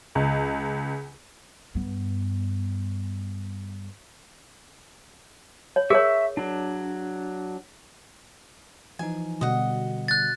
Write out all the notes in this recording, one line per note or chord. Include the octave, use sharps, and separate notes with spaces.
C#2
G2 B3
C#5
G#4 A#4 C#5 E5 C#6 E6
F#3 D4
E3 F3 D#4 G#5
B2 D3 G3 D#5 F#5
F#6 A6